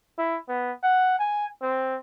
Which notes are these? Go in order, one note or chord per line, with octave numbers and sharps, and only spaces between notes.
E4
B3
F#5
G#5
C4